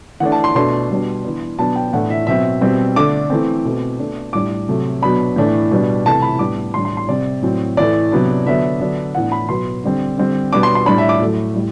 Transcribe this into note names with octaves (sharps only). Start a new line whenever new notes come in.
E3 A3 D4 F#5
A5
C6
B2 A3 D4 C6
B2 G3 D4
E3 B3 D4
B2 F#3 B3 D4 A5
G5
A2 E3 A3 D4 F#5
E5
B2 F#3 C4 E5
B2 G3 C4
D3 A3 D4 D6
E3 A3 C4
B2 A3 C4
B2 A3 D4
A2 G3 D4 D6
C3 F#3 A3
B2 F#3 B3 D4 B5
A2 E3 A3 D4
B2 G3 D4
C3 E3 A3 A5
B5
A2 G3 B3 D4 D6
A2 E3 G3 D4 C6
C6
C6
C3 G3 C4 D5
A2 F#3 C4
A2 E3 A3 D5
C3 F#3 B3 D4
D3 F#3 B3 D4 E5
D3 F#3 B3 D4
A2 E3 B3 D4 F#5
B5
B2 F#3 B3 C6
D3 G3 C4
D3 G3 C4
B2 G3 B3 D4 D6
C6
C6
A2 G3 D4 B5
E5
D6
A2 F#3 A3
A2 G3